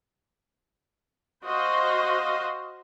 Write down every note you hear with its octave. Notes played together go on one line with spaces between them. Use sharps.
F#4 C5 D#5 F5